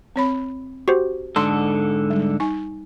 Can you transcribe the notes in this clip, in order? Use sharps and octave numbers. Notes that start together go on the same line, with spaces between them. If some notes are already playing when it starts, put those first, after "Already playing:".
C4 C#5 B5
F#4 G4 C5
G#2 D3 A4 A5 C6
G3
D#4 G#5